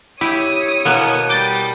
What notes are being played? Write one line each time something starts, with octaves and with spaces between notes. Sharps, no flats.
E4 G4 C#5 D#6
B2 A#3 B3
G3 D6 G6 A6